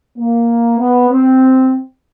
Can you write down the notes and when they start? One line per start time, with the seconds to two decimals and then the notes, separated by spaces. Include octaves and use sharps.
0.17 A#3
0.79 B3
1.10 C4